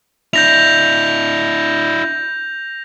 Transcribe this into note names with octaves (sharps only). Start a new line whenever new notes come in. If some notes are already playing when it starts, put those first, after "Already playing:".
D4 E4 G6 A#6 F7